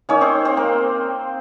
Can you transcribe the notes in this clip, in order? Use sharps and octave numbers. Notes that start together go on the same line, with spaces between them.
A#3 C#4 D#4 C#5
C4 C5
C4 C5
A#3 A#4